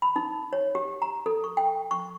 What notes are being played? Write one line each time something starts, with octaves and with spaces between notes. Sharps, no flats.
B5
D#4
C#5
G4
A#5
A4
C#6
G5
C#6